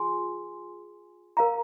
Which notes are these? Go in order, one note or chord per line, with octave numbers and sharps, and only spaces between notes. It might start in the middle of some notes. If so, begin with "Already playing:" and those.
Already playing: F4 G#4 G#5 C6
A#4 F5 A#5